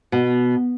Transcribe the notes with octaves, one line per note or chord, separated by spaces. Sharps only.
B2